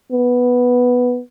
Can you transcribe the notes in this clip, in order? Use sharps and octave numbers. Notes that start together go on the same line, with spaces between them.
B3